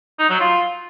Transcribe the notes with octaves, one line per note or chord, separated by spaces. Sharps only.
D#4
F#3
F4